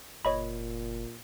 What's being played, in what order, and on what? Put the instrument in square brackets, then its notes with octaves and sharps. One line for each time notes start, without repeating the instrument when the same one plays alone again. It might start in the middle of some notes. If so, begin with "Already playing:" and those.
[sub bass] F#1 [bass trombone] A#2 [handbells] C#5 D#5 B5